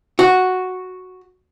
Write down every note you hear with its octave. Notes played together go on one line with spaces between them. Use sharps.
F#4